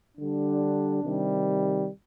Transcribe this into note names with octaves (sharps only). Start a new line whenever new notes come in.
D3 G3 D4
C3 D#3 G3